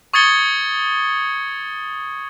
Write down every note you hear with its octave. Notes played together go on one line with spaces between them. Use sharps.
C#6 D#6 G#6 A6 C#7 G7